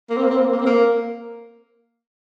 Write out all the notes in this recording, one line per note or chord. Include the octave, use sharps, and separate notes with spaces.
A#3
C4
A#3
C4
A#3
C4
A#3
C4
A#3